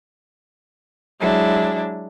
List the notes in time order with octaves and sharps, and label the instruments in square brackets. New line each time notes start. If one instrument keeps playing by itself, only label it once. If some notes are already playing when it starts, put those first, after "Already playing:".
[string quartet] F#3 G#3 D4 E4